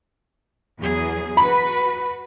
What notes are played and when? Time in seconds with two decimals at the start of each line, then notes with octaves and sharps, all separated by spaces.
0.79 E2 F#3 G#4
1.37 F#4 B4 B5